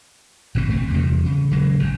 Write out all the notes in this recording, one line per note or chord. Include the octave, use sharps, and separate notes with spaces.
G#1 G2 B2 C4
F1 D2 A3 C4
E2 C3 G3
C#3
D#1 C#3 F#3 G#3
G1 A2